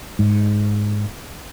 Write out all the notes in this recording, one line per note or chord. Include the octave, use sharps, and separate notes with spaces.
G#2